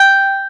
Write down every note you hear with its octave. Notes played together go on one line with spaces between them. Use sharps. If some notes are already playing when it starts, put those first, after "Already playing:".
Already playing: G5